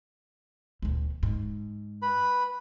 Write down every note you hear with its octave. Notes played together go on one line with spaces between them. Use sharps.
D2 A#2
G#2
B4 B5